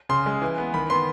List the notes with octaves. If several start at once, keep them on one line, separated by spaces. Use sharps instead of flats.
C#3 C6
G#3
E3
B3
D#3 B5
B3 C6